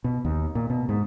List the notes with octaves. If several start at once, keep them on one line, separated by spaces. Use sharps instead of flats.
B2
D#2
A#2
B2
G#2